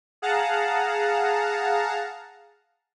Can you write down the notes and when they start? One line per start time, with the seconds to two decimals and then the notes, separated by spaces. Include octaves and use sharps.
0.22 G#4 F5 F#5 A5 A#5